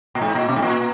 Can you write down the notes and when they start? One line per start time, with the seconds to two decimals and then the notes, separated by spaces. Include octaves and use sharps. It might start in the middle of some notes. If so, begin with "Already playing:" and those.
0.15 A#2
0.22 G#2
0.35 A#2
0.49 B2
0.56 G#2
0.62 A#2